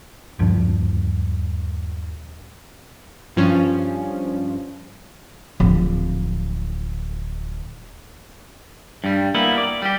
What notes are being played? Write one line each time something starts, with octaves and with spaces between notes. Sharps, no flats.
D#1 C#2 G2 F3
G2 F3 C#4
D1 F3
G2 G3
G3 A#3 B3 E4
D5
G3 G4